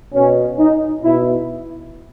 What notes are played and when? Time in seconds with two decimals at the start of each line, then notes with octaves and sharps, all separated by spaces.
0.13 B2 C#4
0.58 D#4
1.03 B2 E4